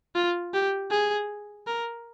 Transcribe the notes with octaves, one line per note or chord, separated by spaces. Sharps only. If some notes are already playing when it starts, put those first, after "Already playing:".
F4
G4
G#4
A#4